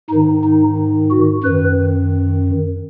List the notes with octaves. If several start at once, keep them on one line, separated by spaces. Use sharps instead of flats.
G#2 D#3 D#4
D#4
F#4
F#2 D#3 B4